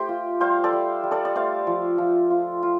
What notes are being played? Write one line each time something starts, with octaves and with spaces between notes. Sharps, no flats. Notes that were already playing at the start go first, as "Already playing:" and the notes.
Already playing: A3 G4 C5
F4
G3 C5 F5
A4 D5
G3
G3
A4 D5
D5
A3 C5 F5
F3
F3
F4
F4